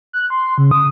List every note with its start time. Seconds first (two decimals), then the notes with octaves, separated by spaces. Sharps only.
0.13 F#6
0.30 C6
0.58 C#3
0.71 D#6